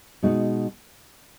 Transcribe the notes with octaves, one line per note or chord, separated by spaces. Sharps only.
B2 G#3 D#4 F#4